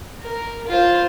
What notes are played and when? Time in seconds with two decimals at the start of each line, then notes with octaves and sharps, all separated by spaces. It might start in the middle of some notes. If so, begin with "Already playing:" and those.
0.22 A#4
0.68 F4 C5